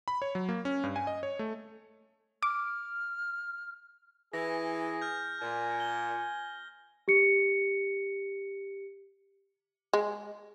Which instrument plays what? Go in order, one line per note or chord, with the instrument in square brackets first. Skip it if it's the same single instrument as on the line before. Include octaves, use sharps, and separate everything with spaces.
[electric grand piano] B5
C#5
F#3
A#3
C#4
G2
G#5
D#5
C#5
A3
[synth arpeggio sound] D6 [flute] F6
[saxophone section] E3 [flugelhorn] G#4 [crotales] A#6
[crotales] F6 G6
[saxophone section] A#2 [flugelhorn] G#5
[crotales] G7
[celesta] G4 C#7
[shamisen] G#3